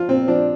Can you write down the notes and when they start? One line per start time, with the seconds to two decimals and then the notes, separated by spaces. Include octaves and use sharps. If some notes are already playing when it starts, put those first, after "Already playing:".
Already playing: F3 F4
0.08 A#2 C4
0.27 F3 D4